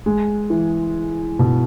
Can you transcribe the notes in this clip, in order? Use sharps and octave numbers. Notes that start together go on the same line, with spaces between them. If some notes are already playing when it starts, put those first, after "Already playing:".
G#3
E3
B2